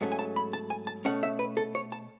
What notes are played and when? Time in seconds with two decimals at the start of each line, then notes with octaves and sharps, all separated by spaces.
0.01 G#2 F#3 A3 C#4
0.12 G#5
0.19 A5
0.36 B5
0.53 A5
0.70 G#5
0.87 A5
1.05 B2 A3 C#4 F#5
1.23 E5
1.39 B4
1.57 A4
1.75 C#5
1.92 A5